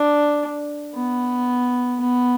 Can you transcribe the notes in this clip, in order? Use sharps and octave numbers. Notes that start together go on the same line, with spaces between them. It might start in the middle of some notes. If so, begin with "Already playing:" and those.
Already playing: D4
B3
B3